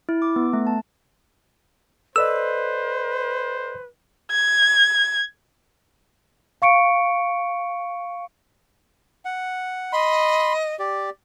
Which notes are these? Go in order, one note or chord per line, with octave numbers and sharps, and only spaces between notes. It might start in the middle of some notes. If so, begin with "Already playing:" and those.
E4
D6
B3
A3
A5
A4 B4 C5 D5 D#5 E6
G#6
F5 C#6 C#7 D7
F#5
D#5 B5 C6
G4 D5